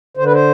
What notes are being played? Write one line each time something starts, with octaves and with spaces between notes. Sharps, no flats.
D3 C5
B4
C5